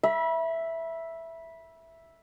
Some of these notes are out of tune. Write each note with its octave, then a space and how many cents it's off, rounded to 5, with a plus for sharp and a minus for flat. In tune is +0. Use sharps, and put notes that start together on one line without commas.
E5 +0 B5 -30